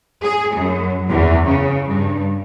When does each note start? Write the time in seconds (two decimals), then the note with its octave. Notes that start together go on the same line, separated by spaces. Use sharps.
0.23 G#4
0.55 F#2
1.09 E2
1.45 C#3
1.87 G2